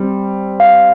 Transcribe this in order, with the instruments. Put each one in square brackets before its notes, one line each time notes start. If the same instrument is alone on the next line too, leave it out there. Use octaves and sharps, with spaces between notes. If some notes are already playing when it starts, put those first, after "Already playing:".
Already playing: [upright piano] G3 C4
[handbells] F5